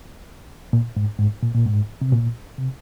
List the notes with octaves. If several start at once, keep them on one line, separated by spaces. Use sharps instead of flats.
A#2
G#2
G#2
A#2
A#2
G#2
C3
A#2
C3